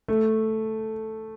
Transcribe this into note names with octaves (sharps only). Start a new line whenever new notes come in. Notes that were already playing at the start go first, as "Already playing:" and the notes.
A3